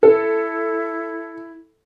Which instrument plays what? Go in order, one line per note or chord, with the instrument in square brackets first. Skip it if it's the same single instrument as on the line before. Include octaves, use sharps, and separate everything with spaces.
[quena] E4 [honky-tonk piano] A4